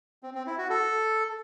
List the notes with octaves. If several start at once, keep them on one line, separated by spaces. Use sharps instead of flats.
C4
C4
E4
F#4
A4